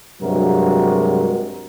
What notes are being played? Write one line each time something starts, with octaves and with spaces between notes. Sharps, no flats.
G2 C3 F#3 G#3 F#4 A#4